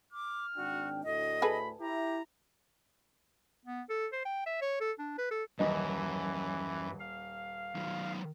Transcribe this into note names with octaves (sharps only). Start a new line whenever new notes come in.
D6 F6
G#1 D4 F#4 G5
D2 A2 D#5
G#4 A4 B4 B5
E4 G4 A#5
B3
A4
C5
G5
E5
C#5
A4
D4
B4
A4
D#1 F#2 E3 D#5
F5
D#3 F#3